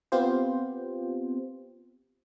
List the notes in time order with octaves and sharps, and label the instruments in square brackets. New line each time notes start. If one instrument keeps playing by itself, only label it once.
[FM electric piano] B3 C4 F4 G4 C5